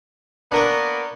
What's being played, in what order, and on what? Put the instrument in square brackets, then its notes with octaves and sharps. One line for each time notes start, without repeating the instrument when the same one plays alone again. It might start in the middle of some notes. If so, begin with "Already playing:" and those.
[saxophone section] A#3 B3 [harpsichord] D4 A#4 C#6